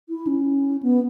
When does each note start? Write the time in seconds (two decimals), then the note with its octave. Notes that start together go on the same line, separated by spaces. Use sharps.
0.09 E4
0.27 C#4
0.83 B3